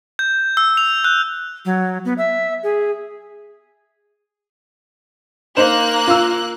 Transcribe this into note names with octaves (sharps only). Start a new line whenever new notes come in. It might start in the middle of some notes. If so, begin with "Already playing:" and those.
G6
E6
F7
F#6
F#3
B3
E5
G#4
A#3 D#4 C5 F#6 E7
F4 E6